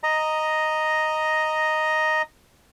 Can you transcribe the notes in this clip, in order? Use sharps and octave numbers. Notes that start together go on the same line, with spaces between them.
D#5 A#5